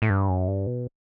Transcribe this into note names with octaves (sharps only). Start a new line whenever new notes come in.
A2
G2
F#2
G2
B2